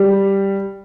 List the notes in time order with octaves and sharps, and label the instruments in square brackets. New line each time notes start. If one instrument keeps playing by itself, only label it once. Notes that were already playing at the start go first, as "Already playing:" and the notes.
Already playing: [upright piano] G3